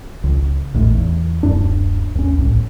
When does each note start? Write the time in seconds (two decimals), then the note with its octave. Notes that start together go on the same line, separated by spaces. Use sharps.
0.24 C#2
0.74 A1 D#2 A2
0.92 E2
1.43 D1 F#2 D4
2.15 D#2 C#4
2.39 C2 A2